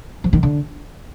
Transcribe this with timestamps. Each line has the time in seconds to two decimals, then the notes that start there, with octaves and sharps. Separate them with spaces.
0.24 F3
0.33 D#3
0.43 D3